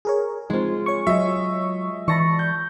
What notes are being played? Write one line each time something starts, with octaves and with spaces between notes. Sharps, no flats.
G#4 A#4 C#5
G#3 C4 D#4 F4
C#5 C#6
F#3 D#5 E5
E3 D5 A5 B5 C#6 A#6
G6